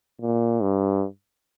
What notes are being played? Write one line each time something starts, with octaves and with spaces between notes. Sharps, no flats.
A#2
G2